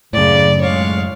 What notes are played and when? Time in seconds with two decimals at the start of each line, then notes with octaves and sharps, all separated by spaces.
0.13 F#2 A2 C#3 D5
0.61 G#3 C#5 F5